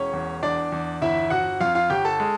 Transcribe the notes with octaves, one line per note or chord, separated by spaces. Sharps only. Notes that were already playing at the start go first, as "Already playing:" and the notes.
Already playing: E1 C#4 C#5
E2
E2 D4 D5
E2
G1 E4 E5
G1 F#4 F#5
F2 F4 F5
F4 F5
G1 G4 G5
A4 A5
G#3